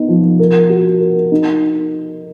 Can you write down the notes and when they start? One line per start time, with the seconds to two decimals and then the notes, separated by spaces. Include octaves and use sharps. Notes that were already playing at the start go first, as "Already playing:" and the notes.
Already playing: B3 D#4
0.09 F3
0.39 A#4
0.70 F#4
1.00 A#4
1.32 D#4